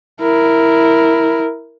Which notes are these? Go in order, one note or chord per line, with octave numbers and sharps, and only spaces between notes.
E4 A#4